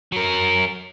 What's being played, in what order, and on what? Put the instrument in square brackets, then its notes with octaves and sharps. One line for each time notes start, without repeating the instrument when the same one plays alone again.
[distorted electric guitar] F#3 A#4